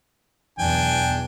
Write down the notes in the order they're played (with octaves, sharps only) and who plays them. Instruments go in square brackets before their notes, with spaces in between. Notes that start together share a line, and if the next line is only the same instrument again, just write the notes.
[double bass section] B1 E2 [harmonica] D4 G5 G#5